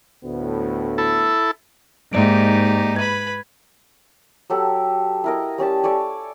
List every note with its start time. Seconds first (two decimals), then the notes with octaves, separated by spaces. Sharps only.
0.24 D2 A2 B3
0.98 E4 A4
2.13 G#2 A#3 D#4 G4 D5 D7
2.96 B4 B5 G#6
4.50 F#3 G4 A4
5.24 E4 A#4 D#5
5.58 G3 C#4 G4 A5
5.83 A4 C#5 D5 G#5